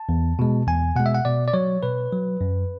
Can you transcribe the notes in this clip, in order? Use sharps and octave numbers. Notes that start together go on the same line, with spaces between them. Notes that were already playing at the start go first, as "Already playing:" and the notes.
Already playing: A5
E2
B2 G#3
E2 G#5
B2 G#3 F#5
E5
F#5
B2 D5
D5
F#3 C#5
B2 B4
F#3
F#2